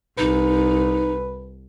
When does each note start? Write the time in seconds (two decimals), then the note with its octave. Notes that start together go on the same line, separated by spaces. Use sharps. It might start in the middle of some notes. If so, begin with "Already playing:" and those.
0.18 C2 D#4 B4